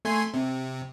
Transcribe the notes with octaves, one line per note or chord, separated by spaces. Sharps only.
A3 G#5 C6
C3